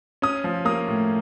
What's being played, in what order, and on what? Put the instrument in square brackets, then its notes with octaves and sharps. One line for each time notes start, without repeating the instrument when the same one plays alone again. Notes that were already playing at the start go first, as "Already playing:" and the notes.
[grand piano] C#4 D#6
F3
A#3 D#6
A2